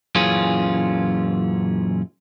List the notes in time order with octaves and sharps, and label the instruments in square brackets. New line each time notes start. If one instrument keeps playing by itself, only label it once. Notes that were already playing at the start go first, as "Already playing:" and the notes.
[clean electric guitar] F#2 A#2 E3 C#4 F4 G#4